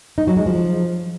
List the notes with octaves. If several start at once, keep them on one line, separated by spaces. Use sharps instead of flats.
D#4
F#3
G#3
F3